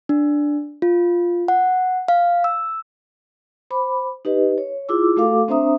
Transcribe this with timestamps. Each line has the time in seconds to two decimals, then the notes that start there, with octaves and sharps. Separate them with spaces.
0.09 D4
0.82 F4
1.48 F#5
2.08 F5
2.44 E6
3.71 C5 B5 D6
4.25 D#4 G4 B4 D#5
4.58 C#5
4.89 E4 F4 G#4 D6 E6
5.17 A3 F#4 A4 F5 D6
5.48 C4 D4 C5 E5 A#5 D#6